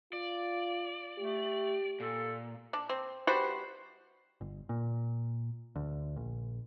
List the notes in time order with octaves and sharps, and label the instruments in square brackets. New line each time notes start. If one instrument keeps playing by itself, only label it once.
[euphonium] F4 [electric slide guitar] D5
[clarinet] A3 [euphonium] G4
[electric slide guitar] A#2 [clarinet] A4
[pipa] D4
C4
G3 F#4 B4 C5
[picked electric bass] G1
A#2
D2
A#1